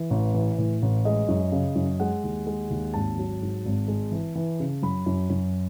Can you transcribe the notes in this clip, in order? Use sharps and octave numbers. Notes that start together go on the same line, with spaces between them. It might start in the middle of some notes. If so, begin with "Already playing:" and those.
Already playing: E3
A1
E3
A2
A1
G#3 D#5
F#2
C#3
F#2
G#3 F#5
D#2
G#3
D#2
G#1 A5
F#3
G#2
G#1
G#3
E3
E3
C#3
F#2 B5
F#2
F#2